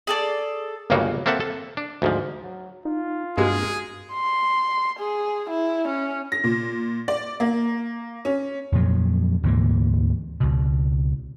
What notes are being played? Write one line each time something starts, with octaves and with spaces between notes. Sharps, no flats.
G#4 A4 D5
G1 C#2 G2 C#3 A#3 F#4
A#3 C4 A4 E5 F#5 A5
A4
D4
D2 G#2 F3
F#3
D#4 F4
G2 B2 G#3 A#3 G#4
C6
G#4
E4
C#4
A#6
A#2
D5
A#3
C#4
F2 A#2 F3 F#3
D2 G#2 E3 A#3
C#2 B2